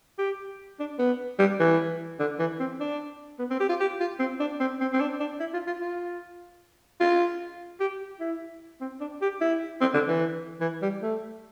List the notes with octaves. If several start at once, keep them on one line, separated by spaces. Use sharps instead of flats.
G4
D4
B3
G3
E3
D3
E3
C4
D4
B3
C4
G4
F4
G4
F4
C4
D4
C4
C4
C4
D4
D4
E4
F4
F4
F4
F4
G4
E4
C4
D4
G4
E4
C4
D3
E3
E3
G3
A3